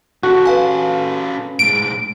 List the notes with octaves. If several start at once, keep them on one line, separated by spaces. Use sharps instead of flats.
C#4 F#4 A4
B4 F5 G#5
A2 G#3 D7